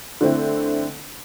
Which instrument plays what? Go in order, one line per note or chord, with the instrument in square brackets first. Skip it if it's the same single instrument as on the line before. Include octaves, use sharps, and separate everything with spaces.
[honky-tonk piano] D3 A3 C4 E4